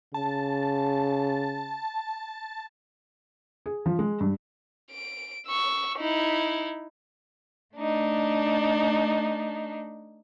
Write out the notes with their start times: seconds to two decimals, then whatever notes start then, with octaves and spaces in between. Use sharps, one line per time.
0.14 C#3 A5
3.66 G#4
3.86 F3
3.99 G#3
4.20 G2
4.91 D7
5.47 C#6 E6
5.99 D#4 E4
7.76 A3 D4 D#4